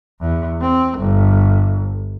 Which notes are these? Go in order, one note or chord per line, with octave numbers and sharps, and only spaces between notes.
E2
C4
G1